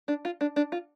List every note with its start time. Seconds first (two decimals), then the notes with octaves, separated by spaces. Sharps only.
0.08 D4
0.25 F4
0.41 D4
0.56 D4
0.72 F4